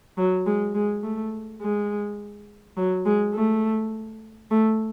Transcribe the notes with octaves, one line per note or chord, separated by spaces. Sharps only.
F#3
G#3
G#3
A3
G#3
F#3
G#3
A3
A3